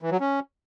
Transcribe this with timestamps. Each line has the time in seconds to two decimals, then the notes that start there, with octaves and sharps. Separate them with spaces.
0.02 E3
0.11 F#3
0.20 C#4